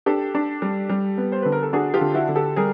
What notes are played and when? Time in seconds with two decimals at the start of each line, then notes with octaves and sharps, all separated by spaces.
0.06 D4 G4 A4
0.35 D4
0.62 G3
0.90 G3
1.18 B3
1.32 C5
1.42 D3 B4
1.52 A#4
1.63 A4
1.73 D4 F#4 G#4
1.94 F4 G4
2.01 D3
2.14 E4 F#4
2.28 D3
2.36 G4 A4
2.56 G3 G#4 A#4